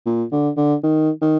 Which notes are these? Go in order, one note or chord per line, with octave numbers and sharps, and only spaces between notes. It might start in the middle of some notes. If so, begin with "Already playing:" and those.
A#2
D3
D3
D#3
D#3